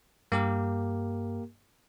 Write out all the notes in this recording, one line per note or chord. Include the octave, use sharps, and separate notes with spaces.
G2 A#3 G4 A#4